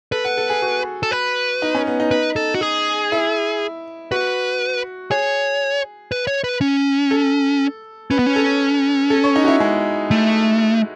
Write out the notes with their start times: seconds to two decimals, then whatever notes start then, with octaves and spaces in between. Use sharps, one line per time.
0.12 A4 B4
0.25 F#5
0.38 A4
0.49 G#4
0.62 F#4
1.03 A4
1.11 B4
1.62 D#4
1.75 C#4
1.87 B3
2.00 D#4
2.11 B4
2.36 A4
2.55 F#4
2.61 G#4
3.12 E4
4.12 F#4 B4
5.11 G#4 C#5
6.12 B4
6.27 C#5
6.44 B4
6.61 C#4
7.11 A4
8.11 C#4 B4
8.19 B3
8.26 C#4
8.36 A4
9.10 A4
9.24 C#5
9.36 D#4
9.44 F#4
9.48 E4
9.60 G#3
10.11 A3